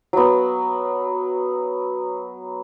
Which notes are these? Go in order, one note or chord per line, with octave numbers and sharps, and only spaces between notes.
F#3 B3